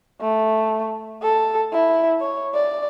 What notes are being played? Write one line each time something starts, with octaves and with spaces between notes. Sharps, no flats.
A3
A4
E4
C#5
D5